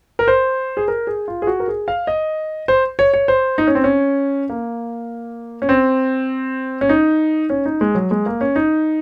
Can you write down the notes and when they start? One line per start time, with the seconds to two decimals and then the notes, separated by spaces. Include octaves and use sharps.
0.19 A#4
0.28 C5
0.77 G#4
0.88 A#4
1.07 G#4
1.28 F4
1.42 G#4
1.47 F#4
1.60 A#4
1.68 G#4
1.88 F5
2.07 D#5
2.68 C5
2.99 C#5
3.14 C#5
3.28 C5
3.58 D#4
3.67 C#4
3.75 C4
3.84 C#4
4.50 A#3
5.62 C#4
5.69 C4
6.81 C#4
6.89 D#4
7.50 C#4
7.66 D#4
7.81 G#3
7.95 F#3
8.11 G#3
8.26 A#3
8.41 C#4
8.56 D#4